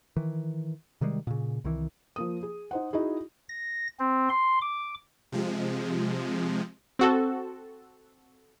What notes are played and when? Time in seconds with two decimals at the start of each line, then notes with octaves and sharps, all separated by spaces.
0.16 D#3 E3
1.01 C3 D#3 G3 G#3
1.27 A#2 C#3
1.64 C2 D#3 E3
2.16 F3 A#3 D#6
2.43 G#4
2.71 D#4 C5 F#5
2.93 D#4 E4 F#4 G#4
3.49 A#6
3.99 C4
4.30 C6
4.62 D6
5.32 C3 F3 G#3
6.99 C4 F#4 A4